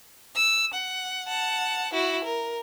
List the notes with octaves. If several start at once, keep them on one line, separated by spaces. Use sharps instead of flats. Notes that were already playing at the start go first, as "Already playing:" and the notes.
E6
F#5
F#5 A5
E4 F#4
A#4